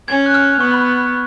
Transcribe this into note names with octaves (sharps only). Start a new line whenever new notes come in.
C#4 G#6
F#6
F6
B3 C#6
B5